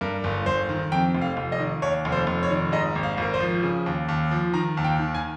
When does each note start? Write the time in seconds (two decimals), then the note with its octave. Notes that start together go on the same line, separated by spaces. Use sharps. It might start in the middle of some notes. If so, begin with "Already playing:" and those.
0.01 G2 A#4
0.24 G1
0.46 G1 C5
0.69 D#3
0.92 F2 G5
1.15 F1
1.21 F5
1.37 F1
1.52 D#5
1.59 D#3
1.82 D#2 C#5
2.05 F1
2.12 C5
2.27 F1
2.43 C#5
2.50 D#3
2.72 G#2 D#5
2.95 G#1
3.03 F5
3.18 G#1 A#4
3.34 C5
3.40 F3
3.63 C#3
3.86 D#2
4.08 D#2
4.31 F3
4.53 D#3 A#5
4.77 D#2
4.84 G5
4.99 D#3
5.15 G#5